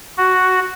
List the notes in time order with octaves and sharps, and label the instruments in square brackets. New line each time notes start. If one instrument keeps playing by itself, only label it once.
[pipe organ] F#4